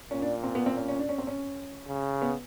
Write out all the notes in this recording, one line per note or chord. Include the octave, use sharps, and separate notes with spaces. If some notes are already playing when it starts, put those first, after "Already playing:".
A#2 C#4
D4
C4
B3
C4
C#4
C#4
D4
C#4
C4
C#4
C#3
B3